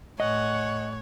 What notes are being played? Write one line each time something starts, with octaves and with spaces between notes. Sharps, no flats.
A2 C#5 D#5 F#5 G#5